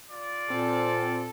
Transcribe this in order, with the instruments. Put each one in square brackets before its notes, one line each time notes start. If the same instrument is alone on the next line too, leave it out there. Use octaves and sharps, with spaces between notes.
[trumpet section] F4 D5
[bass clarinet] A#2 [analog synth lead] C4 [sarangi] A4